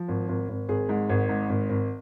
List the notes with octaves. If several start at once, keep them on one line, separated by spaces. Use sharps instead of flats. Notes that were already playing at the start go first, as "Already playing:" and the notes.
Already playing: F3
G#1
G#1
G#1
G#1 G#4
G#2
G#1
G#2
G#1
G#1